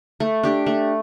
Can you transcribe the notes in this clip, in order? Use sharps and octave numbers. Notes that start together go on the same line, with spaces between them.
A3
D4 G4
A3